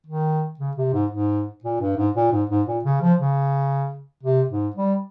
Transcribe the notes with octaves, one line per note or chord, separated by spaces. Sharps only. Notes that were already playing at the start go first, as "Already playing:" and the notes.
D#3
C#3
C3
G#2
G#2
A#2
G2
G#2
A#2
G#2
G#2
A#2
C#3
F3
C#3
C3
G#2
G3